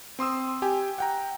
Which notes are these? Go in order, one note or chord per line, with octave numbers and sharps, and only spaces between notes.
C4 C6 D#6 E6
G4 G5 G#5
F#5 G5 A#5